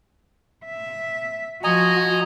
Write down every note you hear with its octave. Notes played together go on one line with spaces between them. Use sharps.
E5
F3 F#4 D#5 G#5 A#5